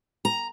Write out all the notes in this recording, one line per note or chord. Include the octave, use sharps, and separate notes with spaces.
A#5